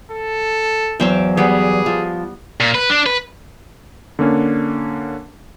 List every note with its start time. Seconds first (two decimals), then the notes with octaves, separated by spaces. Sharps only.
0.12 A4
1.00 E2 F#3 C5 E5 F5 G5
1.37 G3 B3 G#4 B4
1.86 F3
2.60 A#2
2.75 B4
2.90 D4
3.06 B4
4.19 D3 A#3 C#4 D4